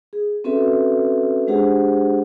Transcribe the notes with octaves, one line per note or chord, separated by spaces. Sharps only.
G#4
C4 C#4 F#4 A4 B4 E5
G#3 D4 G4 G#4 C5 F#5